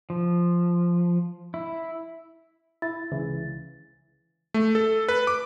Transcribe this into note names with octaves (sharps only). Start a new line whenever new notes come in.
F3
E4
E4 A6
C#2 C#3 E3
A3
A4
B4
D6